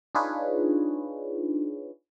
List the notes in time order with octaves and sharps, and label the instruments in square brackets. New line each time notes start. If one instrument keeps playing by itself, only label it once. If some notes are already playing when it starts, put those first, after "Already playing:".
[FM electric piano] D4 D#4 F4 G#4 B4 C#5